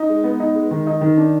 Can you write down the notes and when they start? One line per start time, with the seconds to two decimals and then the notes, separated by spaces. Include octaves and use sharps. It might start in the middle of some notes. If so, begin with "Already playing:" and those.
Already playing: D#4
0.09 G#3
0.24 B3
0.40 D#4
0.55 G#3
0.71 D#3
0.87 D#4
1.01 D#3
1.17 D4